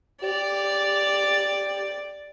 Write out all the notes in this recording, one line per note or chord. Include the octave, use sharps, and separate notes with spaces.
G4 D5